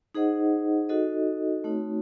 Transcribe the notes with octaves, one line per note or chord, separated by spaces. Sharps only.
D#4 G#4 C5 D#5 F#5
D#4 F#4 A4 D#5
A3 C4 D#4 F#4 C#5